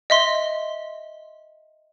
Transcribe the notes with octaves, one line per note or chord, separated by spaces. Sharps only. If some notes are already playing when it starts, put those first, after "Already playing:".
D#5 E5 C6